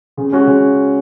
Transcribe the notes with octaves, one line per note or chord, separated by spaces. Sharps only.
C#3
G#3 C#4 F#4
C#3